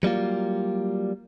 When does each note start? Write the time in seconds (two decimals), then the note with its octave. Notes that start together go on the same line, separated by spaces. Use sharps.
0.03 F#3 G3 A#3 F4